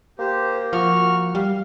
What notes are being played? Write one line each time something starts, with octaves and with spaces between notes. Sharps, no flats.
A#3 G4 C5
F3 F#4 C#6 F6
G3 F5